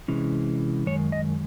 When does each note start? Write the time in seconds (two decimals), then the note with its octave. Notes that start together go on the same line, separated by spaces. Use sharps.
0.08 C3 E3 G#3 C#4
0.86 F#2 D#3 G#3 C#5
1.12 D#5